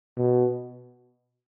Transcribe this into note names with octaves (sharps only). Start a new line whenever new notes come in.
B2